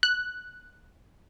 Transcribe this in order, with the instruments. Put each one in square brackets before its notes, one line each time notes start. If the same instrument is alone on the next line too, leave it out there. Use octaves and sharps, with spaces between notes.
[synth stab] F#6